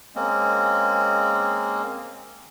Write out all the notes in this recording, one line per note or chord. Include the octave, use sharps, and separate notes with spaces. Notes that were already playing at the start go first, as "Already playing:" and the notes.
G#3 A#3 C4 C#4